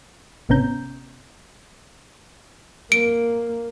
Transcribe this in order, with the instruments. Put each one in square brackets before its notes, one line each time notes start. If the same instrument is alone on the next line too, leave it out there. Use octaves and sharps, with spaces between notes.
[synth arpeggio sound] G#1 C3 B3 C#4 A#5 G6
[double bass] A#3 [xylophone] D7